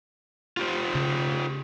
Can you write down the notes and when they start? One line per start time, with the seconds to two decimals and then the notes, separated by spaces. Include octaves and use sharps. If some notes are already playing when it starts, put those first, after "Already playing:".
0.57 F4 G4 C5
0.95 C#3